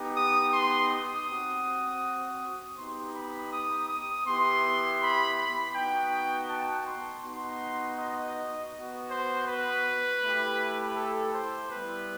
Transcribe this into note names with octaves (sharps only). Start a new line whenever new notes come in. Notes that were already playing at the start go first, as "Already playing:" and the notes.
Already playing: B3 D#4 G4
D#6
C6
D#6
C4 F#4
B3 D#4 G4 C6
B5
D#6
D#6
B3 E4 G4 C6
B5
B5
B3 D#4 F#4 G5
A5
C6
B3 D#4 F#4 C6
D#5
B3 F#4
C5
B4
A3 E4 G4
A4
C5
G3 B3 E4 B4